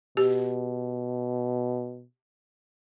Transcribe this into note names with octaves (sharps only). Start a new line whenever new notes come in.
B2 G4